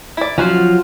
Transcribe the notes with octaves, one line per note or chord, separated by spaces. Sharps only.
E4 D5
F3 F#3 C#4 F4 F#4